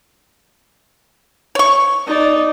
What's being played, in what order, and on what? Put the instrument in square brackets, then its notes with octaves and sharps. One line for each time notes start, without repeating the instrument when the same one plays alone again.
[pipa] C#5 C#6
[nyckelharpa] D#4 D5